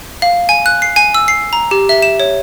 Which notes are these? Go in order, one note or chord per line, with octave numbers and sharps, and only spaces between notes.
F5
G#5
F#6
C7
G#5
E6
C7
A#5
G4
E5
E7
C#5